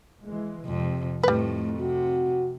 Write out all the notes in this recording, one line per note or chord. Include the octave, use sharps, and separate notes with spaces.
E3 G#3
F2 C3
F2 A2 G3 A3 B4
C3 F#4